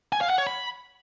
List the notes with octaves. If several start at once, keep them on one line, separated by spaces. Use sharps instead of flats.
G#5
F5
F#5
C#5
B5